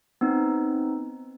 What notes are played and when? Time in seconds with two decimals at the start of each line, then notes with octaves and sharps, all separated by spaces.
0.21 B3 C4 D#4